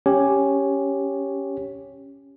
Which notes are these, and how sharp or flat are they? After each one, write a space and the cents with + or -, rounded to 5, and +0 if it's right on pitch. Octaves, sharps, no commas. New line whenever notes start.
C#4 +0 G4 +0 C#5 +0